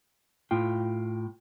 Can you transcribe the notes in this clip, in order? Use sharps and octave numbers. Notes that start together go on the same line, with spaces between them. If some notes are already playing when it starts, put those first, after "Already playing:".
A2 F4 G5